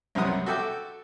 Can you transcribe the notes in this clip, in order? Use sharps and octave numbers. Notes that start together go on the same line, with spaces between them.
C2 F#2 C3 B3 F#5 D#6
F#4 A4 E5 G5 D6